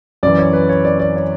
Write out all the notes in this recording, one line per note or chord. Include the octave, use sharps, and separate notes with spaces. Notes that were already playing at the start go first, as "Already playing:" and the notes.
F#2 E3 D5
C#5
B4
C#5
D5
D5
C#5